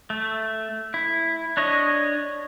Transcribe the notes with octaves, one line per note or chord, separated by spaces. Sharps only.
A3
E4
D4 C#5 D#5